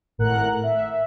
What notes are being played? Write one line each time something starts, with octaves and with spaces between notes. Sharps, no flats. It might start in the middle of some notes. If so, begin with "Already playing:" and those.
G#1 A2 A#4 F#5 F#6
E5